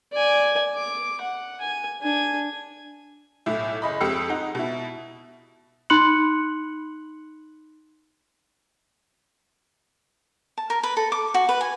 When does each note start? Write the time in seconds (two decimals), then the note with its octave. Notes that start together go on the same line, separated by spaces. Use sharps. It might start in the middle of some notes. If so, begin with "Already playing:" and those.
0.12 D5 G#5
0.74 D6
1.21 F#5
1.61 G#5
2.02 D4 G#5
3.46 B1 A2 E4
3.82 F#1 D#5 B5
4.00 F2 G#3 G4 E6 C#7
4.29 D#4 F#5
4.55 B2 E4
5.90 D#4 B5 C6 F#6 C#7 F#7
10.58 A5
10.70 A#4
10.83 B4
10.97 A4
11.12 D6
11.34 F#4
11.49 B4
11.61 G#5